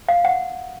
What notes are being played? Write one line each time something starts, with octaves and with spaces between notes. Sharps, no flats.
F5
F#5